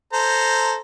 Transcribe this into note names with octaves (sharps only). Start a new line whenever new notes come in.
A4 C5 A#5